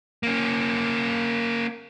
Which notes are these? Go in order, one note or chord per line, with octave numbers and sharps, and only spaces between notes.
A#3 C#4